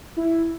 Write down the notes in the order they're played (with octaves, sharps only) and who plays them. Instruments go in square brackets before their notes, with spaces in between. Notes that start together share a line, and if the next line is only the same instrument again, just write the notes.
[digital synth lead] E4